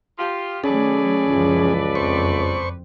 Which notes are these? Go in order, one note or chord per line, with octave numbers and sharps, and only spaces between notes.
F4 G4
D#3 F#3 A3 C#4 G#4 A4 B4 D5
C#2 F#2 E3 F3
F#1 F2 C4 C5 C#6